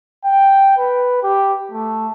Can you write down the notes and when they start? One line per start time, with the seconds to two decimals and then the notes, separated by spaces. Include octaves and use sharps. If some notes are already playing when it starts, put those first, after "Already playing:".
0.25 G5
0.77 B4
1.23 G4
1.72 A3